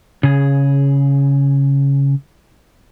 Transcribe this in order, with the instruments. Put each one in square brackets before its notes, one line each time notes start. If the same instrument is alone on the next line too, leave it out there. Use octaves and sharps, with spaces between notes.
[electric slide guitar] C#3 G#4